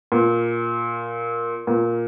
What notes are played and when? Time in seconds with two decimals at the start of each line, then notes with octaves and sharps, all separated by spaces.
0.12 A#2
1.67 A#2